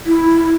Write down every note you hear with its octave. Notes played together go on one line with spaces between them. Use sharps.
E4